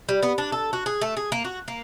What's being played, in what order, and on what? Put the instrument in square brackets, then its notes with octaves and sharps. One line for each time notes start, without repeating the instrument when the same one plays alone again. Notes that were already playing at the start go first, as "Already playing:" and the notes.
[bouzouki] G3
B3
D4
A4
F#4
G#4
A3
G#4
A#3
F#4
A#3